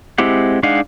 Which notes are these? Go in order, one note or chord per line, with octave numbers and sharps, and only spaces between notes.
G#3 C4 E4 G4 F#5
G#3 D4 D#4 F5 F#5